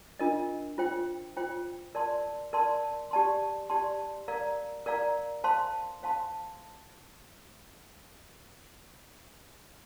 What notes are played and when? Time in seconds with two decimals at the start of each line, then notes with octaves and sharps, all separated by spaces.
0.19 D4 F4 A#4 D#5
0.78 F4 C5 G5
1.37 F4 C5 G5
1.95 A#4 D5 A5 C6
2.53 A#4 D5 A5 C6
3.11 G4 D5 A5 C6
3.70 G4 D5 A5 C6
4.28 A#4 D5 F5 A#5
4.86 A#4 D5 F5 A#5
5.44 C5 F5 A5 C6
6.03 C5 F5 A5 C6